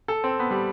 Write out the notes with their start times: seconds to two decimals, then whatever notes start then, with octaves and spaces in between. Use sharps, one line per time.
0.08 A4
0.24 C4
0.40 B3
0.51 G3